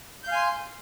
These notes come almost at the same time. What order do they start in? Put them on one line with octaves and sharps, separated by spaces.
G6 F5 G#5 C6